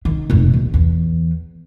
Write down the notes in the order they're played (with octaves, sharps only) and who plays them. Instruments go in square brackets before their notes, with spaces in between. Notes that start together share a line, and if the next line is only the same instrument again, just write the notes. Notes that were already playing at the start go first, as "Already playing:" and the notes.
[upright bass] D#3
F1 A#1
D#2
E2